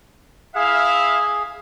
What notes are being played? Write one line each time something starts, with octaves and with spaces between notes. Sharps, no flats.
E4 G#4 E5 F5